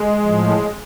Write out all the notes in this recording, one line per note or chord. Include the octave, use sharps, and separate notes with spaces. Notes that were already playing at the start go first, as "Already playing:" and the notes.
Already playing: G#3
A2 F3